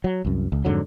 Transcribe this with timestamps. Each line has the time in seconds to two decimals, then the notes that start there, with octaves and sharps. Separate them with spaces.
0.04 F#3
0.25 C2 F#2
0.52 C#2
0.65 F2 G#2 D3 F#3